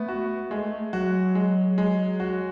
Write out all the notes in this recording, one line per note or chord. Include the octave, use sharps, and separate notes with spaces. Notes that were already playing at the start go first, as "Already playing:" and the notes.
Already playing: A3 B3
F#4
G#3 A3
F#3 F#4
G#3
G#3
F#4